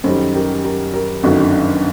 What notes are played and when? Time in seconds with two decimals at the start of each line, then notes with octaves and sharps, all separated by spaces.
0.04 F#2 D#3 G3 A4 C5
0.34 G4 A#4
0.64 G4 A#4
0.94 G4 A#4
1.23 G1 F#2 D#3 F#4 A4
1.38 D4 F#4